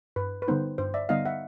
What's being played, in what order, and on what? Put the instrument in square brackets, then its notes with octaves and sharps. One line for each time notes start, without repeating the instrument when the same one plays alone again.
[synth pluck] G2 [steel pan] B4
[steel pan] B4
[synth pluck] D3 G3 B3 D#4 [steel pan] C5
[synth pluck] G2 [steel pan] C5
[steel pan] D5 E5
[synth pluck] D3 G3 B3 D#4 [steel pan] D#5 F5
[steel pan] E5 F#5